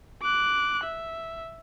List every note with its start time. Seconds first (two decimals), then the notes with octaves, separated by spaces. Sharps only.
0.22 D6 F#6
0.83 E5